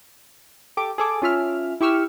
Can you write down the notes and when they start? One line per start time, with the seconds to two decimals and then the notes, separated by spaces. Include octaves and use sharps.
0.77 G4 A4 D6
0.98 G#4 A4 D6
1.22 C#4 F4 E5 F6
1.81 E4 G4 C#6 E6 F6